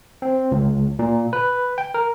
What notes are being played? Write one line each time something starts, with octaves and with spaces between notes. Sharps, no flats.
C4
C#2
A#2
B4
G5
A#4